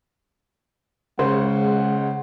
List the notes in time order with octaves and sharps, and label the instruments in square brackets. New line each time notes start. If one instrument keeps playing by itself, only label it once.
[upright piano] C#3 [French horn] G#3 [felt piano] C5 [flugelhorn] F#5